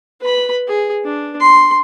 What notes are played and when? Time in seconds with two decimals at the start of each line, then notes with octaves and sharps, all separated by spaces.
0.20 B4 B5
0.67 G#4
1.04 D4
1.40 C6